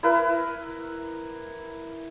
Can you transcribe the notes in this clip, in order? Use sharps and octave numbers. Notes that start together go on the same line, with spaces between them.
E4 A#4 B4